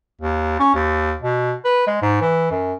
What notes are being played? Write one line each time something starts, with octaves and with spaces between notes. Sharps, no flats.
D#2
C#4
D#2
B2
B4
G#3
G#2
E3
F#2